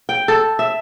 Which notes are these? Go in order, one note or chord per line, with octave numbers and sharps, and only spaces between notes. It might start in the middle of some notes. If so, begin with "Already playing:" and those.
G5
A4
E5